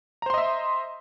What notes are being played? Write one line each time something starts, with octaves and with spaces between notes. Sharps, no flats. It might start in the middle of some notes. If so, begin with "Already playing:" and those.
C5 D#5 E5 A#5 C6